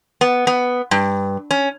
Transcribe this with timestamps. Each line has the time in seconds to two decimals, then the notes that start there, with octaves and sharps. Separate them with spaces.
0.21 B3
0.47 B3
0.91 G2
1.51 C#4